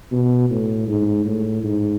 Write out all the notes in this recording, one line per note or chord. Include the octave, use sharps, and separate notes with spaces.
B2
A2
G#2
A2
G#2